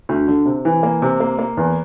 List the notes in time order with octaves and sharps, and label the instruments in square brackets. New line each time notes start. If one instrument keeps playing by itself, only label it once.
[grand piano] D2
D3
C3
E3
A#3
C3
A#3
A#3
E2